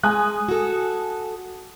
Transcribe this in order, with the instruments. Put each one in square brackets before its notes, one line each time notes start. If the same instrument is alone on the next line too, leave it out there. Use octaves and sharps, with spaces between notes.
[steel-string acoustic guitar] G#3 [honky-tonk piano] G#5 D#6 F#6
[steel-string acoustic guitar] F#4 A4